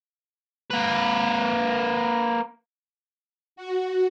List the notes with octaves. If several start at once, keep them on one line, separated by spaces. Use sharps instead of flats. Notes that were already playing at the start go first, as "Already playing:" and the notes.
A#3 B4
F#4